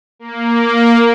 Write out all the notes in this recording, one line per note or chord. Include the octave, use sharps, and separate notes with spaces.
A#3